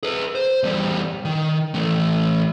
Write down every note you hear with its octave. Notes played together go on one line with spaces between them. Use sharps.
G#4 B4
C5
E2 G3
D#3
E3 A3